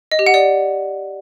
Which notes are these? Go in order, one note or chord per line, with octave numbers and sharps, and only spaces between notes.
D#5
G4
F#5
D5